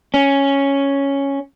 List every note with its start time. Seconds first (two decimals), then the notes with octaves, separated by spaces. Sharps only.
0.14 C#4